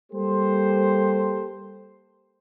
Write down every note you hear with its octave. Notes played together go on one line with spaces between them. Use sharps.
G3 A#3 G4 A4 C5